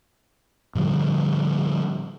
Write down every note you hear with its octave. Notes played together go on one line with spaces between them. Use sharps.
A2 D3 F3 G3